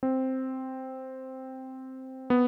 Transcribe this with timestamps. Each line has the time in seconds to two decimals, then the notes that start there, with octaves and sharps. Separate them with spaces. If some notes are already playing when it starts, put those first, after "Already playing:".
0.03 C4
2.30 B3